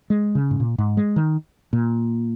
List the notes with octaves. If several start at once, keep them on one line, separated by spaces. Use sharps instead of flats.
G#3
C#3
G#2
A#2
G#2
G#3
D#3
A#2